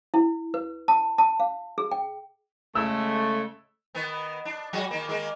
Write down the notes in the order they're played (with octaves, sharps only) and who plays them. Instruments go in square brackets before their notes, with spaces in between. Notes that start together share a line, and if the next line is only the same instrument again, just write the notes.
[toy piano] E4
B4
A5
A5
F5
G#4
G5
[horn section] C#3 G#3 A3 [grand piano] E6
[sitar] D#3 B3
D4
F#3 G#3 F#4
D#3 A#3
D#3 G#3 A#3